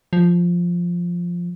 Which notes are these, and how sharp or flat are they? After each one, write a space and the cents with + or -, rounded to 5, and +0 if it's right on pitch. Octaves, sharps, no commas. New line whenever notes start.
F3 +0